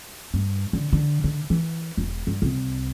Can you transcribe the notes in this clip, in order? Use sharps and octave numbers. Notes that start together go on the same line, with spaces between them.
G2
D3
D3
D3
E3
E1
G2
C2